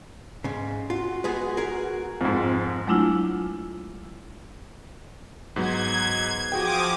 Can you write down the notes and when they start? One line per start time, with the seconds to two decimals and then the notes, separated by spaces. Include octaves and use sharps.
0.44 G#2 C#3
0.90 F4 F#4
1.24 G#3 B3 G#4
1.57 G#4 A#4
2.21 F2 G#2 C4
2.87 F#3 G#3 A3 D4 E4 F4
5.56 G#2 F#3 B3 G#6
6.52 F3 F#4 G#4 G5 D6 D#6